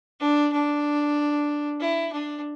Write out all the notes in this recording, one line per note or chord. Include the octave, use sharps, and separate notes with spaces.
D4
D4
E4
D4